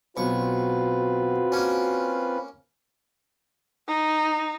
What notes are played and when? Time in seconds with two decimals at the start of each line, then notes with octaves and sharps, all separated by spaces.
0.17 B1 C4 F4 F#4 B4 C#6
1.52 A#3 C#4
3.88 D#4